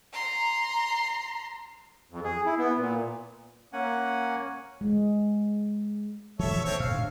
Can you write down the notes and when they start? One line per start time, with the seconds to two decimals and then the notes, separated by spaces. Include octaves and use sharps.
0.13 A#5 C6
2.11 F2
2.24 G#4
2.46 E4
2.58 B3
2.77 A#2
3.73 A#3 C#4 F#5 G#5
4.81 G#3
6.39 E3 A4 C#5 E5
6.53 D#1 D2
6.65 C4 C#5
6.80 A2 F5
6.91 G#2 F3 D4